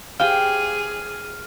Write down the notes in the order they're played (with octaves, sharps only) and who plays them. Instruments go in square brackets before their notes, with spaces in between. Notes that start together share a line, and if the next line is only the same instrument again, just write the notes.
[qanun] G4 C5 G5 [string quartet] G#4 [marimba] F5 [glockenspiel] F6